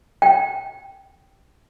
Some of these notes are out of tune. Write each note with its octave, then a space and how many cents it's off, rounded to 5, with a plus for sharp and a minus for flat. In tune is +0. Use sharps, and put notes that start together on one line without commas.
G5 -10